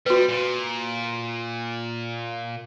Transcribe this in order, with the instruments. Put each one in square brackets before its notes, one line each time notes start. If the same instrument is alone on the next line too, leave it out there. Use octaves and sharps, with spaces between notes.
[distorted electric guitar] G3 [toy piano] F#4 B4
[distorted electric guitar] A#2